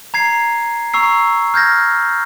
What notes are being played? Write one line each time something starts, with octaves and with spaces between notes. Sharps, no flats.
A#5 G#6 C7
A#5 C#6 E6 C7
F6 G6 G#6 A#6